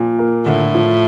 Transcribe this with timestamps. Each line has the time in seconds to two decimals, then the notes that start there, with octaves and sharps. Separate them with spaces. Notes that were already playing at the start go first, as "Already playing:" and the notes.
Already playing: A#2 F3
0.19 A#3
0.46 A2 D3
0.74 F3